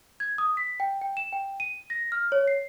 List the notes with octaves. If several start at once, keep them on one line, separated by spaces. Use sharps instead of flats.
G#6
D#6
B6
G5
G5
E7
G5
D#7
A#6
F6
C#5
C7